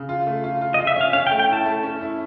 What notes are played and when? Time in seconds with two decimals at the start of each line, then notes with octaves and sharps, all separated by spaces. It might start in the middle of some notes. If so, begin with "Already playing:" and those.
Already playing: C#3
0.09 F4
0.27 A3
0.44 F4
0.61 F4
0.74 D#5
0.79 F4
0.87 E5
0.96 C#4 F5
1.13 C#4 F5
1.27 G5
1.31 A3
1.39 G5
1.49 E4 A5
1.66 A3
1.83 C#4
2.01 E4